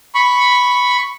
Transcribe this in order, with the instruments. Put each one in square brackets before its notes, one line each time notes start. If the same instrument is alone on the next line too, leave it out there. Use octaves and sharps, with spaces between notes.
[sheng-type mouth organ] B5 C#6